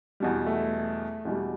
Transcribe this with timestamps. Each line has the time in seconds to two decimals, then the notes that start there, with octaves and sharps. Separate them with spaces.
0.20 E2 B2 G3
0.46 A3
1.25 E2 B2 G3